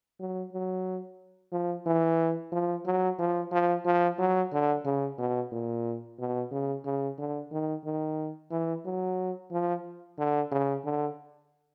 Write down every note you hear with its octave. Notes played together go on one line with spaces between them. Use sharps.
F#3
F#3
F3
E3
F3
F#3
F3
F3
F3
F#3
D3
C#3
B2
A#2
B2
C#3
C#3
D3
D#3
D#3
E3
F#3
F3
D3
C#3
D3